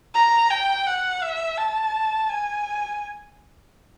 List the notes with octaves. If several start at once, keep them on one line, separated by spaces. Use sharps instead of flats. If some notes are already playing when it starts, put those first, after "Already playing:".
A#5
G5
F#5
E5
A5
G#5